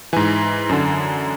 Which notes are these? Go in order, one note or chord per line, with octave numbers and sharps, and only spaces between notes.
G#2 E3 G#5
F#2 D3